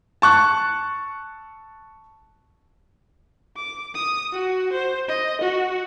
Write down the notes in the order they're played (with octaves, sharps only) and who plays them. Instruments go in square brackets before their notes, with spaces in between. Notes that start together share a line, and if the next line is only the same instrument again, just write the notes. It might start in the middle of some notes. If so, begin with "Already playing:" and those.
[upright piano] A5 C#6 F#6
[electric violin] D6
D#6
F#4
C5
D#5
F#4